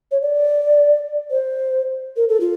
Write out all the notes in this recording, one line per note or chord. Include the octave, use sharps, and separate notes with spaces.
C#5
D5
C5
A#4
A4
F4